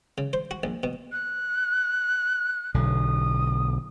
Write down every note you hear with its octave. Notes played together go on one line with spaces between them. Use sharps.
C#3
C5
F#4
A#1
B2
F#6
B1 D3 D#6